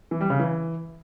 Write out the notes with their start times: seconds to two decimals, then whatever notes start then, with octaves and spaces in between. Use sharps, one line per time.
0.11 E3
0.21 G3
0.30 C#3
0.40 E3